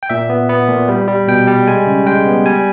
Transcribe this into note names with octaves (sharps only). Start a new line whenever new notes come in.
G5
A#2 E5
B3
B3
A#2
G3
G3
B2 G5
G3
G#3 G#5
C#3
G#3 G5
B3
G3 G#5